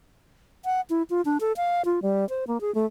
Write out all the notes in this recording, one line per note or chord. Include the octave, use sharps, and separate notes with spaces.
F#5
E4
F4
D4
A4
F5
F4
G3
C5
A#3
G#4
A3